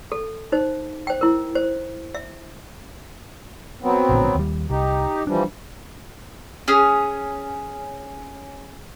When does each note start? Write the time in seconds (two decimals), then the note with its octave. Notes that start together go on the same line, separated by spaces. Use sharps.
0.12 A4
0.52 D#4 C5
1.07 C5 G5
1.21 E4 A#4
1.55 C5
2.15 E5
3.82 F#3 B3 C4
4.09 A#1 A2 D3
4.35 D#2 G3
4.70 C2 D#4 G4
5.27 E3 F3 G3 D4
6.68 C#4 G#4